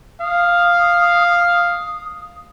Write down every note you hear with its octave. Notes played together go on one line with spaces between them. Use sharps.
F5 D#6